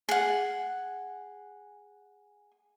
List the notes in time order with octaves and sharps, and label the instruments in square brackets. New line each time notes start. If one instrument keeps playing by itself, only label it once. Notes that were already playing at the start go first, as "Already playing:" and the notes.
[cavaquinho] G#4 F#5